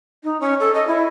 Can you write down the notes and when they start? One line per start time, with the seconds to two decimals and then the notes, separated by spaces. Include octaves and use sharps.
0.24 D#4
0.41 C#4
0.60 A4
0.74 D#5
0.87 E4